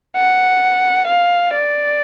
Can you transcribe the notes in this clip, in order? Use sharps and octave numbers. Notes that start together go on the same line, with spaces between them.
F#5
F5
D5